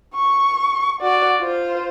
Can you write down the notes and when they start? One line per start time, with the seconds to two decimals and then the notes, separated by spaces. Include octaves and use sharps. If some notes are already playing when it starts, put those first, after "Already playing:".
0.14 C#6
1.01 F#4 D5
1.40 F4 C5